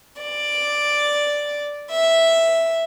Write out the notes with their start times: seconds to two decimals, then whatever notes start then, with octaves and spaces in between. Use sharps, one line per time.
0.20 D5
1.91 E5